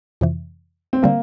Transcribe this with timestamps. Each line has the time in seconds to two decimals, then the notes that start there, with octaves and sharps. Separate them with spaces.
0.21 F2 C3 E3
0.93 C4
1.02 D3 G3 A#3